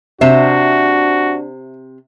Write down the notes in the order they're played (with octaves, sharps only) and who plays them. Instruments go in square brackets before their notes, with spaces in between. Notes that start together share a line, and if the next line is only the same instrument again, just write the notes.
[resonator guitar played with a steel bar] C3 C5 [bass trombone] D4 [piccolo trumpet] F#4 [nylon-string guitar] E5